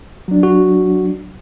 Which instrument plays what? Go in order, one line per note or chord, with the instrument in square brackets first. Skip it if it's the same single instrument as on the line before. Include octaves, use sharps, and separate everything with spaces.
[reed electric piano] F#3 D4
[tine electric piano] F#4